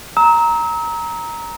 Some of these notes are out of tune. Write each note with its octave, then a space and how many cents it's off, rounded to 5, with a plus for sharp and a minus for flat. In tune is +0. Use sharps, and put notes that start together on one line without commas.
A#5 +0 E6 -45